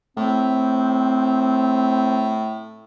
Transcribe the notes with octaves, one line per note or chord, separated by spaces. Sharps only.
A2 C4